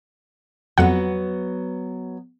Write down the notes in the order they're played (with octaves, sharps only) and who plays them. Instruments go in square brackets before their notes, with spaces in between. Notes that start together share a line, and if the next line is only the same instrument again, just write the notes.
[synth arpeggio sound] F2 F#5 [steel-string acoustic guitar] F#3 B3